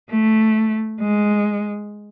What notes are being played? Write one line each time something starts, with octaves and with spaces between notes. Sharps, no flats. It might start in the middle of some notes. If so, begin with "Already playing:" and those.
A3
G#3